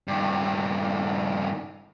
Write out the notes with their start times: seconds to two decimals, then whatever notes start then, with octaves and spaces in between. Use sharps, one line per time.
0.08 G2 D#3